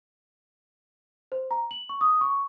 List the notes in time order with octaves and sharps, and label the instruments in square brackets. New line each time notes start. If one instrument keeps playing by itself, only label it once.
[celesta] C5
A#5
F#7
C#6
D#6
C#6